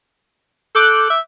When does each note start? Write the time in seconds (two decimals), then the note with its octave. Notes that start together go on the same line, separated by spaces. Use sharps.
0.75 A4 D6 F#6 G6
1.10 E5